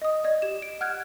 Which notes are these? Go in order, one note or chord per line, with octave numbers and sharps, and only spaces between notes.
D#5 D#6
D5 D#5 G#6
G4 E7
D7
F#5 F6 F#6 G#6